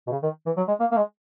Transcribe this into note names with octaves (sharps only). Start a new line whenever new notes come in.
B2
C#3
D#3
E3
F#3
G#3
A#3
A#3
G#3